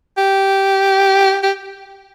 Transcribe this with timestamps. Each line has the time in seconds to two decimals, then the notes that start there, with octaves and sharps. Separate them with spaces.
0.18 G4
1.43 G4